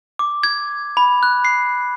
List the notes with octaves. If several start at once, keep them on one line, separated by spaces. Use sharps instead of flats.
D6
G#6
B5
F#6
C7